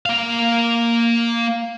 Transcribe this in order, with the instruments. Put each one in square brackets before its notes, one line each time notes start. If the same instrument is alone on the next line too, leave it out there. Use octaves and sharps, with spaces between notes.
[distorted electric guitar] A#3 F5